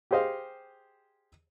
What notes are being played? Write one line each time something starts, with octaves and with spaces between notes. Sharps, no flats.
G4 G#4 C5 D#5 F5